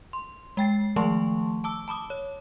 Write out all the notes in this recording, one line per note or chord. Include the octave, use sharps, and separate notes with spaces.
C6
G#3 G5 A6 C7
D#3 F3 A3 A5 C6 C#6
A5 D6 E6
A5 B5 D6 D#6
C#5